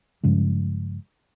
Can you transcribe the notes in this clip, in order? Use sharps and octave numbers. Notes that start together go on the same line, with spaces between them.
G2 C#3 F3 G#3